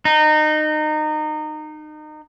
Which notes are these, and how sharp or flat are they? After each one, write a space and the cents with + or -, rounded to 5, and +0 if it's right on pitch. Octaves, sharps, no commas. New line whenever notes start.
D#4 -25